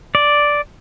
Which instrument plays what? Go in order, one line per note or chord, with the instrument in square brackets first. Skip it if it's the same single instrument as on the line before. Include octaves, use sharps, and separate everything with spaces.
[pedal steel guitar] D5